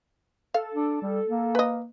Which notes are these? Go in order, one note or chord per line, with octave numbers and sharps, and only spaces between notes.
A4 F5
D4
G3
A#3
B4 D#5